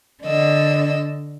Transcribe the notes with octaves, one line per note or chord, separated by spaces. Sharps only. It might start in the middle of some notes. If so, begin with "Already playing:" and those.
D3 D#5 E6